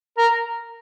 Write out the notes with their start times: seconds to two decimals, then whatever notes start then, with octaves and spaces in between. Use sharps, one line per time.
0.18 A#4